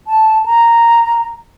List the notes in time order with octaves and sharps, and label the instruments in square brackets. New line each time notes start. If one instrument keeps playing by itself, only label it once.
[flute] A5
A#5